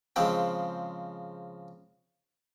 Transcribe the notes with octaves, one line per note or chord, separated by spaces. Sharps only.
C#3 F3 G#3 C4 G5 B5